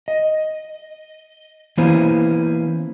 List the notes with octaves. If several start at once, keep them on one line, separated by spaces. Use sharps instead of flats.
D#5
E3 A#3 B3 C#4 E4 C5